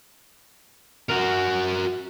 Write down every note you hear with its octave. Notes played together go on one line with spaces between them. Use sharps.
F#4 A#4